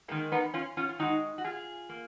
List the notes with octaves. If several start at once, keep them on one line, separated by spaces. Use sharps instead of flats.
D#3 G#3 A#3
B3 D#4
C#4 F4
C#4 F4
F4
D#3 G#3 D#4 F#4
F#4
F4 G#4
A#3